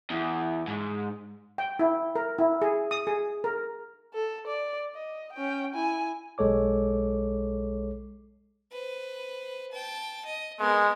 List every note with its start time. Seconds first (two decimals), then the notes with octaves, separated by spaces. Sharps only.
0.10 E2
0.67 G#2
1.58 G5
1.79 E4
2.16 A#4
2.38 E4
2.62 G#4
2.91 D#6
3.07 G#4
3.44 A#4
4.14 A4
4.47 D5
4.95 D#5
5.33 C#4 G5
5.75 E4 G#5
6.38 B1 G#3 A4 C#5 D6
8.72 B4 C5
9.72 G5 A5
10.25 D#5
10.60 G#3 B3 A#4